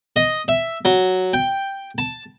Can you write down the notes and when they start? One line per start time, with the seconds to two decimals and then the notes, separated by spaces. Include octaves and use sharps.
0.16 D#5
0.48 E5
0.85 F#3
1.33 G5
1.98 A5